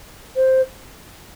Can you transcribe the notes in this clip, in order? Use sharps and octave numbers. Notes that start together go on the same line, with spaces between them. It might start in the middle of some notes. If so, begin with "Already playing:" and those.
C5